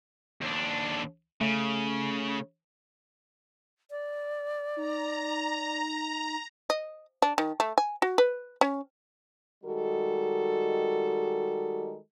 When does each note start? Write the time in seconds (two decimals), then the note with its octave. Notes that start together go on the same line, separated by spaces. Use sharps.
0.42 D#2 D4
1.41 C#3 A3
3.91 D5
4.76 D#4 A#5
6.70 D#5
7.22 D4
7.38 D#3
7.60 A3
7.78 G#5
8.02 F#4
8.18 B4
8.61 C#4
9.64 D#3 G3 G#3 F#4 A4